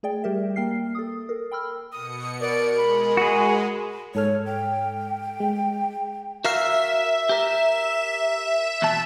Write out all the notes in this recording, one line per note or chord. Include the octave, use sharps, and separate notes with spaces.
A3 G#4 D5 G5
G3 G4 A#4 E5
A#3 G5 F6 C7
A4 D#6
A4 A#4
G5 B5 E6 F6
B2 D#6 C#7
A#4 D5
G#3 B5
F#4 G#4
G#2 A4 C#5 F6
G5
G#3
F#4 A#4 E5 F5
G4 A#4
E2 B2 A5